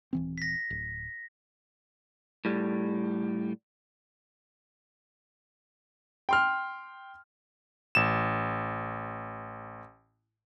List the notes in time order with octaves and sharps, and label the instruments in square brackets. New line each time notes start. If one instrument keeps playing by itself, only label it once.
[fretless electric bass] D#1 E3 C4
[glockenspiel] A#6 B6
[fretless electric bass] D1
[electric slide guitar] A2 G3
[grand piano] G5 C6 F6
[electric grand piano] A1 E7